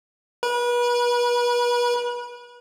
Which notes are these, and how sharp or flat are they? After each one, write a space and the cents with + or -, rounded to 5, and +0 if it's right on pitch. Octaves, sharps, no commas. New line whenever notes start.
B4 -35